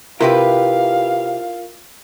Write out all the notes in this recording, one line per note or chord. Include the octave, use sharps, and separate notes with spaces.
C3 E4 F4 G4 A#4 B4 F5